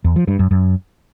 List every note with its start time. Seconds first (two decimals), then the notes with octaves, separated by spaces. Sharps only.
0.04 E2
0.16 F3
0.28 G2
0.39 F#2
0.51 F#2